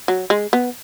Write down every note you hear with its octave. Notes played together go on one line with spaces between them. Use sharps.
F#3
G#3
B3